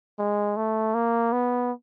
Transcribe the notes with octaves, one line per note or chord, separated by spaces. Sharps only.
G#3
A3
A#3
B3